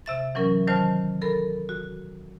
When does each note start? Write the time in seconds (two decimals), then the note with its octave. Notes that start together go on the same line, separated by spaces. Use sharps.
0.06 C3 E5 A6
0.35 E3 F#3 C#4 A#4
0.68 D#3 F#3 C5 A5 F6
1.22 A4 A#4 B5
1.69 F#4